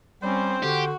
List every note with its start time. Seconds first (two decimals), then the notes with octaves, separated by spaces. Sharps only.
0.23 G3 C4 C#4 C5
0.63 D3 F#4 G4